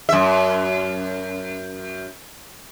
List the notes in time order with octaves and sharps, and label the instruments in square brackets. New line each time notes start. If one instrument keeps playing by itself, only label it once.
[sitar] F#2 E5